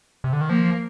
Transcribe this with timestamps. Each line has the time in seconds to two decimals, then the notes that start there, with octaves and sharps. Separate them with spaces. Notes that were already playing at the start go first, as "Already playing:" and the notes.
0.24 C3
0.33 D3
0.41 D#3
0.49 F3 A#3